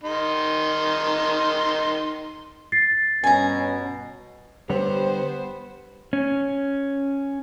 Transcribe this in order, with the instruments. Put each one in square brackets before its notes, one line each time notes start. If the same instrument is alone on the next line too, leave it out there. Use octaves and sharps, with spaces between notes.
[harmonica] D#3 D#4 C6
[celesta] A6 C7
[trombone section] G2 C#4 [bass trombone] B2 [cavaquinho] G#5 A#5
[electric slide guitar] D3 G3 C#5 [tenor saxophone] B3 [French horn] G4 [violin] C5
[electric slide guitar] C#4